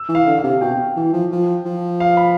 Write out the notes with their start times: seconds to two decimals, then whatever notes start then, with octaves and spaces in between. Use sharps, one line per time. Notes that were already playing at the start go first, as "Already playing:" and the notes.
Already playing: E6
0.09 E3
0.15 F5
0.27 D3
0.38 F5
0.44 C3
0.61 B2 G5
0.97 E3
1.13 F3
1.32 F3
1.65 F3
2.00 F5
2.17 B5